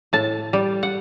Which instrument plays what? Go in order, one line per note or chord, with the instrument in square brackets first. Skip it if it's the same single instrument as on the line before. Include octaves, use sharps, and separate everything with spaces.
[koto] A2 A5
G3
F#5